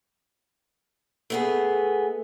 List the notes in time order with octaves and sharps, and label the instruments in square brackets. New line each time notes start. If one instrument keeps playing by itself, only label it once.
[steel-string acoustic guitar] A3 B3 G#4